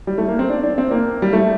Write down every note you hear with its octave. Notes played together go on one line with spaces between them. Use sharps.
G3
A3
A#3
C4
D4
D4
C4
A#3
G3
A3